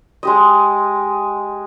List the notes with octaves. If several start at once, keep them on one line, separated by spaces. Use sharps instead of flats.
G#3 G4 D#5